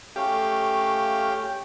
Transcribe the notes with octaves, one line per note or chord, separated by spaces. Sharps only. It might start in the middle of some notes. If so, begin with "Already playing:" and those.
A3 C#4 G4 F5